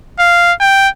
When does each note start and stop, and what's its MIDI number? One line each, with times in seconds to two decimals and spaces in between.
0.19 0.52 77
0.60 0.88 79